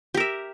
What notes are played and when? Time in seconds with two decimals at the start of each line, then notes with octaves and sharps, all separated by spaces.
0.14 G4
0.17 A#4
0.20 E5